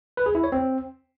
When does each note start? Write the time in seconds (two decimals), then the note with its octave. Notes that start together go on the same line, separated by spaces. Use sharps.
0.17 B4
0.26 G#4
0.35 E4
0.44 C#5
0.52 C4